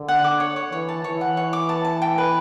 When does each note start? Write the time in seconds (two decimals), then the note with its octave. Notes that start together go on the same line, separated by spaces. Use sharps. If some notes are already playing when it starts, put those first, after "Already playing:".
Already playing: D3
0.08 F#5
0.24 D6
0.40 C#5
0.56 C#5
0.72 E3 C#5
0.89 A5
1.04 E3 C#5
1.21 F#5
1.37 C#5
1.53 D6
1.69 A5
1.85 A5
2.02 G5
2.18 B4